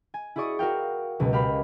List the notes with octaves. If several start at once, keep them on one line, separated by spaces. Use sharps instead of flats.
G#5
E4 F#4 G#4 D5 C#6 D#6
F#4 A#4 F5 G5
C#2 B2 F#3 G#3
G4 A#4 F5 B5